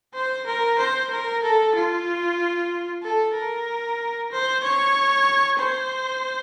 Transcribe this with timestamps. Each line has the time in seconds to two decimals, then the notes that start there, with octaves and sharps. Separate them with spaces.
0.14 C5
0.46 A#4
0.78 C5
1.11 A#4
1.43 A4
1.75 F4
3.03 A4
3.34 A#4
4.32 C5
4.63 C#5
5.59 C5